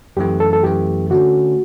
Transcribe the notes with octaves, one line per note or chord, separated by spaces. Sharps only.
F#2 E3 A3 G4
A4
A4
F#2 E3 A3 G4
D3 A3 C#4 F#4